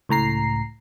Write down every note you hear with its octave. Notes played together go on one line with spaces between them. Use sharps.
C#2 A2 A#5 C7